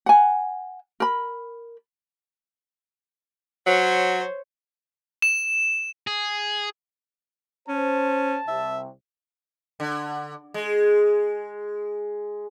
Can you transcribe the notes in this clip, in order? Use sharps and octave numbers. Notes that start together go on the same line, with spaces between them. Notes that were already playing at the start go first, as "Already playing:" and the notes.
F#5 G#5
A#4 B5
F#3 C5 C#5
E7
G#4
C#4 C5 A5
C2 C3 E5
D3
G#3